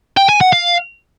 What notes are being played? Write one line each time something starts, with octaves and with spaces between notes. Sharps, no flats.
G5
G#5
F#5
F5